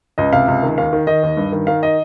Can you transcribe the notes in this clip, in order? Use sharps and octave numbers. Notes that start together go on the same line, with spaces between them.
C#2 D#5
C3 F5
C#2
D#3
D#2 F5
D#3
D#3 D#5
D#2
G2
D#3
D#3 F5
D#5